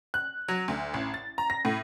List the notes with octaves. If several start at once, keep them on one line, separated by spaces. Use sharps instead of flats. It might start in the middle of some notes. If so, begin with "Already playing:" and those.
F#6
F#3
D2
A1
A6
A#5
A#6
A2